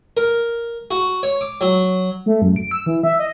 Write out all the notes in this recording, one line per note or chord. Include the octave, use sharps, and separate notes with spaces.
A#4
F#4
C#5
D6
F#3
A3
F#2
D7
E6
E3
E5
D#5